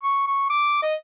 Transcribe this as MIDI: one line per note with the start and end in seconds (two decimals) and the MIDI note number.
0.03 0.23 85
0.27 0.50 85
0.50 0.80 86
0.82 0.95 75